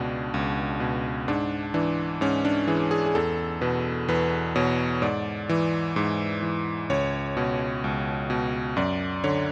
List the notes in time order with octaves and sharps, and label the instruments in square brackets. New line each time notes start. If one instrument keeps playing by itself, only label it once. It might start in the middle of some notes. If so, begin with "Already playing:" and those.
Already playing: [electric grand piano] C#2 B2 D4
C#2
B2
G#2 D4
E3 D4
G#2 C#4
D4
E3 G#4
G#4
G#4
E2 A4
B2 B4
E2 B4
B2 C#5
G#2 D5
E3
G#2
E3
C#2 C#5
B2
C#2
B2
F#2 D5
D3 C#5